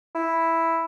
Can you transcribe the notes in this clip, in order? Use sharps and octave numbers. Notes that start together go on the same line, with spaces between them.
E4